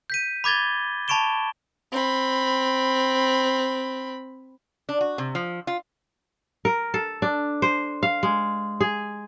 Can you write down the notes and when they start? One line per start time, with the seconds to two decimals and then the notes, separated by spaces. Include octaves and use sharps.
0.10 G6 B6 D#7
0.44 B5 D6 G#6 A6 G7
1.08 A5 B5 C#6 D7 E7 G7
1.92 C4 B5
4.89 D4
5.01 F#4
5.18 C3
5.35 F3
5.67 F4
6.65 A#4
6.94 A4
7.22 D4
7.62 C5
8.03 F5
8.23 G#3
8.81 G#4